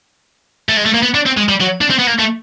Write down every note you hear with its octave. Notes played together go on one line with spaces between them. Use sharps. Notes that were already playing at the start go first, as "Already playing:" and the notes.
A3
G#3
A3
A#3
B3
D4
C4
G#3
G3
F#3
D4
C4
B3
A#3
A3